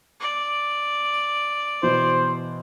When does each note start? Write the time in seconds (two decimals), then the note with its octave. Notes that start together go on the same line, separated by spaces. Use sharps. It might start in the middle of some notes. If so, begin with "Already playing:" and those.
0.20 D5
1.83 B2 E3 C5